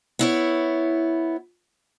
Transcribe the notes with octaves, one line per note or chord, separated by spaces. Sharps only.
B3 E4 C#5